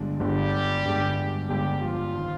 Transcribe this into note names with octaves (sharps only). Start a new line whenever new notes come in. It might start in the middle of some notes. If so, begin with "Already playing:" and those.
Already playing: G1 G2 D3 G#3 D4
G1 G2 D3 G3 G#3 D4 G4
G1 G2 D3 G#3 D4
G1 G2 D3 G3 G#3 D4 G4
F3 F4
D#3